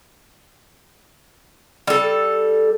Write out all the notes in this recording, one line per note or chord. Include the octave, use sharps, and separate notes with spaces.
G3 A4